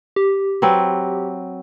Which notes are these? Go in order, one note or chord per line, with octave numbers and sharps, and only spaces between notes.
G4
F#3 C4 B4